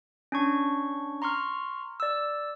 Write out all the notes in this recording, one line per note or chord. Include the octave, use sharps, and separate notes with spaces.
C#4 D4 C#6
A#5 C6 C#6 F6
D5 E6